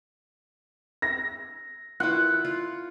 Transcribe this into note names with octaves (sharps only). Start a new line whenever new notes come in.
A#6
E4 F4 F#5
F4